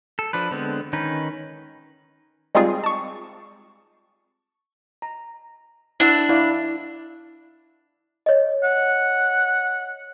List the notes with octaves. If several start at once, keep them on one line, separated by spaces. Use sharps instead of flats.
A4
F3 D4 B4
D3 G#3 B3 C4
D#3 C#4 D#4 B4
G3 G#3 C4 D#4 F4 G#4
A5 C#6
A#5
D4 E4 F#5 E6
E4 D5 F5
C#5 D#5
F#5